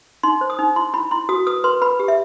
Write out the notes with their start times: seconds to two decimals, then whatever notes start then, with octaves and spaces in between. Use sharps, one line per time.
0.23 D#4 C6
0.41 C5
0.50 D#6
0.59 D#4
0.76 E4 C6
0.94 E4 B5
1.11 E4 C6
1.29 F#4 D#6
1.47 B4 D#6
1.64 B4 C6
1.82 B4 B5
1.99 G4
2.08 E5